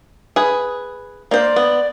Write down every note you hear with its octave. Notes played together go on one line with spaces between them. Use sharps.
G#4 B4
A#3 C5 D5
B3